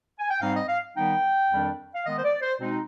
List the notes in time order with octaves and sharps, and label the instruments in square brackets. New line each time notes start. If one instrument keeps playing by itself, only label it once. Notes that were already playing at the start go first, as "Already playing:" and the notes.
[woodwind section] G#5
G5
G#2 G3 C4 D#4 F5
D#5
F5
D#3 G3 B3 D#4 G5
F2 D#3 G3 D4
F5
D#3 G#3 B3 D#5
C5
D5
C5
B2 G#3 C4 D#4